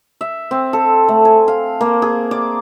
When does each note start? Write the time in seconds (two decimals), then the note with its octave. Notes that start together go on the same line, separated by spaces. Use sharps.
0.21 E5
0.51 C4
0.73 A4
1.09 A3
1.25 G#5
1.48 F5
1.81 A#3
2.02 G#4
2.31 D5